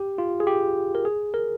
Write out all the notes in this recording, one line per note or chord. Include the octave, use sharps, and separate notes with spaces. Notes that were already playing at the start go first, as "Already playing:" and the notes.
Already playing: G4
F4
G#4
G4
A#4
G#4
A#4